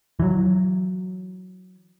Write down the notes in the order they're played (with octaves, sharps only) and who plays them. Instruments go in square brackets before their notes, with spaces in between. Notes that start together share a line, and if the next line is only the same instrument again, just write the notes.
[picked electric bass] E3 F#3